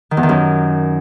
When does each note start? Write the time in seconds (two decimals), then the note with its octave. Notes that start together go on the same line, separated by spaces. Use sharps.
0.11 D#3
0.17 E2
0.23 D#3
0.29 F#2